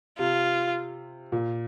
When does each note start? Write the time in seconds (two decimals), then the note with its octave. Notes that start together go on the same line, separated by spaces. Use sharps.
0.19 C3 F4
1.32 A#2